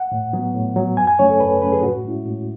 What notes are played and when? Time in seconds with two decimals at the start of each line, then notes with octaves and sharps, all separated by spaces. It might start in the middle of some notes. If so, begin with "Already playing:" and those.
Already playing: F#5
0.12 A2
0.33 F#3 B3
0.54 A2
0.76 F#3 B3
0.97 F#2 G#5
1.07 G#5
1.19 C#3 F#3 A3 C#4 C#5
1.30 A4
1.40 F#2 B4
1.62 C#3 F#3 A3 C#4 B4
1.72 G#4
1.83 A2 F#4
2.05 G#3 C#4 E4
2.26 A2